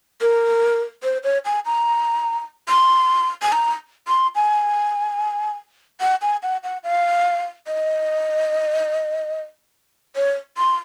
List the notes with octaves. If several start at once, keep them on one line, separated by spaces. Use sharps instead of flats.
A#4
C5
C#5
G#5
A#5
C6
G#5
A#5
C6
G#5
F#5
G#5
F#5
F#5
F5
D#5
C#5
C6